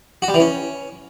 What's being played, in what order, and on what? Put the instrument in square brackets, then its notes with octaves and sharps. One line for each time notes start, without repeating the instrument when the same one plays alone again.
[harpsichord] F#4
G3
E3
C#4